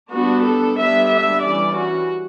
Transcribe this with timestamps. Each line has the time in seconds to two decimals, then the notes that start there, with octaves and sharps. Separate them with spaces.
0.11 G3 B3 D4 F#4
0.44 A4
0.77 D3 G3 B3 D4 E5
1.10 E5
1.43 E3 G3 C#4 D5
1.76 F#4